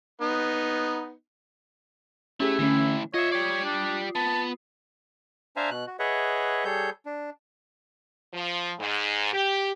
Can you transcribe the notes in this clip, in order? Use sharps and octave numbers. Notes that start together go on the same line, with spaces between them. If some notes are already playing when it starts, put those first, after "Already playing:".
B3 D#4
A3 C#4 E4 G4 G#4
A2 D3 E3 A3 C#4
F4 C#5 D#5 E5 D#6 C7
G4 C#5 D5
D4
B3 A5
D4 C5 E5 F5 G#5 A#5
B2 F#6
F#4
G#4 B4 C#5 D#5 E5 F#5
G3 G#4 A4 C#5 G6
D4
F3
G#2
G4